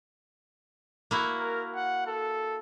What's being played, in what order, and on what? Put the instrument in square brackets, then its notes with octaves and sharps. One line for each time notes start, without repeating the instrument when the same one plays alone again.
[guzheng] A#3 E4 F#4
[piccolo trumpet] A#4
F#5
A4